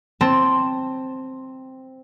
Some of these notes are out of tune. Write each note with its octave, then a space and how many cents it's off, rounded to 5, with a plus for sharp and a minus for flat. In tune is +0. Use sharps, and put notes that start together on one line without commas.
C4 +0 A5 +0